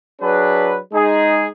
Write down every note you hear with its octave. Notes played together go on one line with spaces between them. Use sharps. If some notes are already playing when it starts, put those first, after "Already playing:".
F#3 D4 G#4 B4
G#3 D#4 G#4